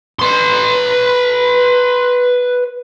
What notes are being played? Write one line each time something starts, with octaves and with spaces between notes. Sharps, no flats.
B4 C6